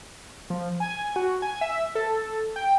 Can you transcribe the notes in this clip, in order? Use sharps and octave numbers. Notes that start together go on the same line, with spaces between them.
F3
G#5
F#4
G#5
E5
A4
G5